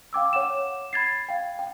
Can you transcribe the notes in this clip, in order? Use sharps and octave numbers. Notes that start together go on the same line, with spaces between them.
F5 G5 D6 E6
C#5 F#5 D6 E7
B5 G#6 A6 C7
F5 G5
G5